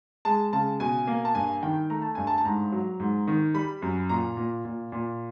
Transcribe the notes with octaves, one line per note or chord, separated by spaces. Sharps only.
G#3 A5
C#3 A5
B2 G#5
A#3
A5
G2 G#5
D#3 G5
A3 A#5
A5
G2 G#5
A5
A5
G#2 A#5
F#3
G#2
D#3
G3 B5
F#2
A#2 A#5
A#2
A#2
A#2